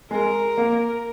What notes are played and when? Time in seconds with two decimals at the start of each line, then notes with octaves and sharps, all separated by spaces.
0.11 G#3 A#4
0.58 A#3